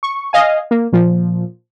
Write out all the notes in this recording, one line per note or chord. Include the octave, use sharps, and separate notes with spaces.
C#6
D#5 F5 G#5
A#3
A#2 F3